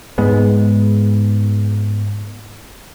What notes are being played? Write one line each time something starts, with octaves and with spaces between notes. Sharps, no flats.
G#2 G#3 B3